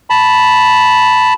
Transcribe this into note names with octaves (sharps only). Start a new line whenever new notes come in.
A5 B5